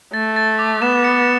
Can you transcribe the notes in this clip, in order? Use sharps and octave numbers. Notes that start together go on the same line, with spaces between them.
A3 A6
A6
D6
B3 E7
C#7